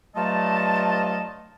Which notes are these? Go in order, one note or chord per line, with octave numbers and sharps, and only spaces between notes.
G2 F#3 A3 F4 D#5 A5